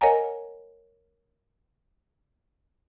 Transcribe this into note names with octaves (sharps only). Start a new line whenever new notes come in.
A#4 C#5 D#5 F#5 G#5 A#5